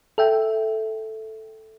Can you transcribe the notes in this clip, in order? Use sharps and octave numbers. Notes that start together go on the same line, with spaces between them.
A4 E5 G5